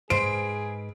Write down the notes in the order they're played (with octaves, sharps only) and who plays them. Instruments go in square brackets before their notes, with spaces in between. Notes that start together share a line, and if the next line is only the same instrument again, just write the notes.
[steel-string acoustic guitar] G#2 B4 [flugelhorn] G#4 [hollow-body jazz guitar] C5 [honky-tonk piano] D7